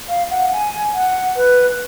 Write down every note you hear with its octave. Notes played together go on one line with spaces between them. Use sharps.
F5
F#5
G#5
F#5
B4